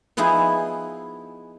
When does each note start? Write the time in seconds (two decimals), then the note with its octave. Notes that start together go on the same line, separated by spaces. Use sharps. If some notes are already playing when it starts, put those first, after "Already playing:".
0.17 F3 B3 D#4 E4 G#4